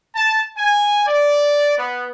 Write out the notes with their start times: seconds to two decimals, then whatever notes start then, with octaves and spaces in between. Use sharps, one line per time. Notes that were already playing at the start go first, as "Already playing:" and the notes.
0.15 A5
0.58 G#5
1.07 D5
1.77 B3